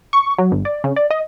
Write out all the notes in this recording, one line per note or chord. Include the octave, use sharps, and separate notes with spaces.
C#6
F#3
G1
D5
C#3
D5
D#5